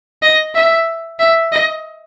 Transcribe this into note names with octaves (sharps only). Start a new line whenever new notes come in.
D#5
E5
E5
D#5